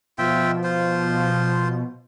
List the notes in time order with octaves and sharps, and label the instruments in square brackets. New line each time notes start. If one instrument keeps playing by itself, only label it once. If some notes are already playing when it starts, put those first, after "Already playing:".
[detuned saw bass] B2 [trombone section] F3 [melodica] F4 E5 G5
[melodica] F4 C5